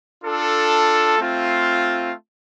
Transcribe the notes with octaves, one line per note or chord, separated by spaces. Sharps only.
D4 F4 A4
A3 C4 F4